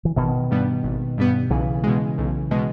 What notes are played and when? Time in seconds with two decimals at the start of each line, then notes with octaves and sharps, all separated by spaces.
0.05 E3
0.16 G#1 B2 D#3
0.51 G2 G3 B3
0.83 G#1
1.18 G2 G3 B3
1.50 B1 C#3 E3
1.84 B2 G#3
2.18 B1
2.51 B2 G#3